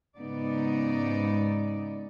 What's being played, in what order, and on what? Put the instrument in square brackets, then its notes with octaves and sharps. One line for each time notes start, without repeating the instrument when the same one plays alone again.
[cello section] G#2 C#3 B3 D#4 D5